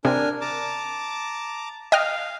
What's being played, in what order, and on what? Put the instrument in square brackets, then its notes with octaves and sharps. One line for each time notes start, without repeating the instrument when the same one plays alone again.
[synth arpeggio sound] C3 [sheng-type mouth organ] D4 A#4 G#5
[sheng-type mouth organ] A5 A#5 D6
[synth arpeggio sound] D#5 G5 F6 [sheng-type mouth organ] F5